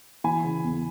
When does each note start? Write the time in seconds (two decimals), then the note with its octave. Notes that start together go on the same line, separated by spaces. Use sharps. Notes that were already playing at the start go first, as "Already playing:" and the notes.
0.24 E3 G#5 B5
0.44 C#3
0.64 E2